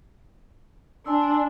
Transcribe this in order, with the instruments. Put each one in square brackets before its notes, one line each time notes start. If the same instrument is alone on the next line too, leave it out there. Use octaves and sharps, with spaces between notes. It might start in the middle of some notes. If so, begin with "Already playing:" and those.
[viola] D4 [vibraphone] G#5 C6 E6